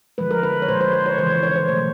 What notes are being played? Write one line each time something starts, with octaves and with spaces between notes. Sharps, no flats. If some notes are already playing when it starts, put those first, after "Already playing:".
D3 F3 G#3 B4
A#4
B4
C#5
A#2 F3 G#3 C5
C5
C5
C#5
C#3 E3 G#3 C5
C#5
C#5
C5
B2 F#3 A3 C5